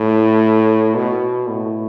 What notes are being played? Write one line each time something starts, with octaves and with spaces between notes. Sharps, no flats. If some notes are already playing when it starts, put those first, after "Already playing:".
Already playing: A2
B2
A2